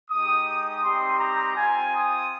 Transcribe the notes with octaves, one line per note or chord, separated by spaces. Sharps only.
G#3 D#4 G4 D#6
D#6
G3 C4 D#4 G4 C6
A#5
C4 F4 G#5
D#6